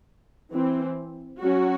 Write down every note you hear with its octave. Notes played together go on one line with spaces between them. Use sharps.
E3 C4
F#3 C#4 F#4